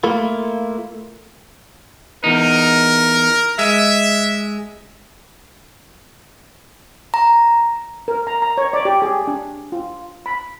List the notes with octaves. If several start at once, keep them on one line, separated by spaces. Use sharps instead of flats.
A3 A#3 E4 F4
E2 D#4 A#4
G#3 E5
A#5
A#4
A#5
A#5
C#5
D5
G4
G#4
D4
F4
B5